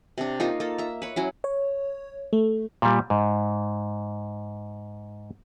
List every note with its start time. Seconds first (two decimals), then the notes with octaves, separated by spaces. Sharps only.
0.18 C3 D4
0.40 A#3 D#4 F4
0.60 A#3 A4
0.78 E5 A#5
1.02 B4 C#5
1.16 F#3 C#4 E4
1.44 C#5
2.33 A3
2.82 A#2 G3
3.10 G#2